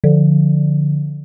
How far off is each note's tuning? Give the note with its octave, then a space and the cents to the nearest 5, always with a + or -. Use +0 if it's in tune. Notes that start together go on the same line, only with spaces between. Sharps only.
D3 +0 F3 +0